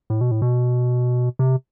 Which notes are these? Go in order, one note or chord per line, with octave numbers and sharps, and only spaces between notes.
A2
B2
A2
B2
C3